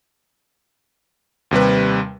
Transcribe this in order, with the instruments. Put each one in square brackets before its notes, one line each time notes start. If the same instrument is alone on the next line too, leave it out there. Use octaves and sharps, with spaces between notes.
[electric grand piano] D#2 C3 G3 B4